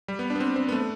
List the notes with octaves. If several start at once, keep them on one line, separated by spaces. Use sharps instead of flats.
G3
B3
D4
B3
C4
C4
B3
A3